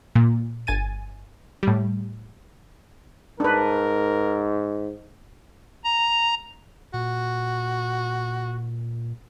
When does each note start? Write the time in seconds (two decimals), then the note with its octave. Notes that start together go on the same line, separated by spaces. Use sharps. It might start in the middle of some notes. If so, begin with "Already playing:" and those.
0.15 A#2
0.67 G1 G#5 A6 D#7
1.63 A2 G3
3.40 G#2 D4 A#4 B4
5.84 A#5
6.94 A#2 F#4